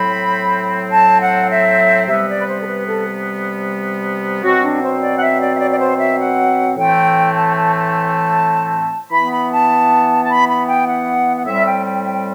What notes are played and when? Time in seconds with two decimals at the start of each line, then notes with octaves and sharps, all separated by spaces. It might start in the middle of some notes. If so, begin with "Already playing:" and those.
Already playing: A2 F#3 C4 B5
0.90 A5
1.20 F#5
1.50 E5
2.08 C3 G3 B3 E5
2.28 D5
2.40 B4
2.47 C5
2.60 A4
2.67 B4
2.86 A4
4.43 B2 F#3 C4 F#4
4.62 D4
4.82 C5
5.01 D5
5.16 F#5
5.20 E5
5.40 D5
5.54 E5
5.59 D5
5.70 D5
5.79 C5
5.98 E5
6.19 F#5
6.77 A2 E3 A3 C4 G5
7.35 A5
7.55 A5
7.75 A5
9.11 E3 B3 B5
9.31 B5
9.51 A5
10.24 A5
10.28 B5
10.48 B5
10.67 G5
10.86 F#5
11.36 F#5
11.45 A2 G3 C4 E5
11.65 G5
11.85 G5
12.04 G5